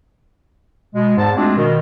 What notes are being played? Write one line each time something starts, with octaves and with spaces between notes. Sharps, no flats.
B2 G#3
E2 G#2 A5
G#3 A3 C4 D4 F4 F#4
B2 D#3